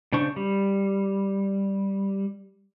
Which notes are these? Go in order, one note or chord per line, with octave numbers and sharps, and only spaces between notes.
C#3 D4 C5 C#6
G3